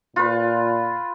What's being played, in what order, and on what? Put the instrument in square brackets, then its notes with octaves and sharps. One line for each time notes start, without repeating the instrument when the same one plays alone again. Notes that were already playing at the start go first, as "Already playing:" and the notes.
[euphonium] A#2 [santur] F4 B4